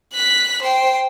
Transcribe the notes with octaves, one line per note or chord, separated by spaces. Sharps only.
F#6 B6
C5 G5